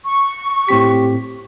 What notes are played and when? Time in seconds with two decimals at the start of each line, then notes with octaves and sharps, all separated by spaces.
0.05 C#6
0.69 A2 C4 G4 B6